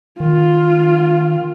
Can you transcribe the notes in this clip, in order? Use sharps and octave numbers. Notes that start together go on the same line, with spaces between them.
D#3 F4